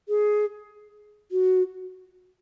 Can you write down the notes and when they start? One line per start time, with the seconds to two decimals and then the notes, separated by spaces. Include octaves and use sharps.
0.09 G#4
1.31 F#4